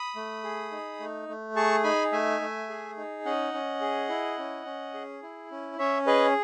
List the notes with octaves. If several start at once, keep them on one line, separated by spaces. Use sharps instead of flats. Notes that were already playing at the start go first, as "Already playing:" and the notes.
Already playing: B5 D#6
A3
G#4
D#4
A3
A3
G#4 A5 C#6
D#4 G#5 B5
A3 E5 G#5
A3
G#4
D#4
C#4 D#5 F#5
C#4
G#4
E4
C#4
C#4
G#4
E4
C#4
C#4 C#5 E5
G#4 B4 D#5